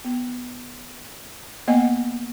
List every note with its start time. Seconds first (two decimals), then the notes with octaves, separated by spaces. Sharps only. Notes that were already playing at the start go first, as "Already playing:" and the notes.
0.05 B3
1.67 A#3 B3 D#5 F#5 G#5